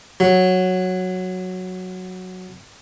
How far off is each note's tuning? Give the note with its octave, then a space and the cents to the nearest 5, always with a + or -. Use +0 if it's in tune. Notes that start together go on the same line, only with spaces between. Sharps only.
F#3 -5